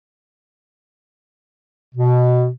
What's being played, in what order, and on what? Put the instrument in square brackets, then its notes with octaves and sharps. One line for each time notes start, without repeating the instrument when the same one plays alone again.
[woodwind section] B2